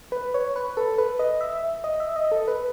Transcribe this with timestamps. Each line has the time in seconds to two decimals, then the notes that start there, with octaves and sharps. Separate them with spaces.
0.12 B4
0.34 C#5
0.56 B4
0.77 A4
0.98 B4
1.19 D#5
1.41 E5
1.84 D#5
2.00 E5
2.16 D#5
2.32 A4
2.48 B4